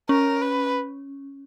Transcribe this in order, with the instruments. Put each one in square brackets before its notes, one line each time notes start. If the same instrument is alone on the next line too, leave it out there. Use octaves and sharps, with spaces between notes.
[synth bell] C#4 [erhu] A#4
[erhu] B4